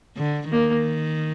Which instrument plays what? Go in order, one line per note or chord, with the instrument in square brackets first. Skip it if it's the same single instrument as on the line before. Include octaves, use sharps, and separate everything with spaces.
[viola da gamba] D3
[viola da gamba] D#3 [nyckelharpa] A#3